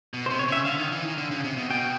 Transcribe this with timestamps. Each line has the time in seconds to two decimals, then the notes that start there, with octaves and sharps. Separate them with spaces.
0.14 B2
0.26 C5
0.30 C3
0.39 C#5
0.48 C#3 E5
0.65 D3 F5
0.78 D#3
0.92 E3
1.04 D#3
1.18 D3
1.31 C#3
1.44 C3
1.57 B2
1.70 B2 G5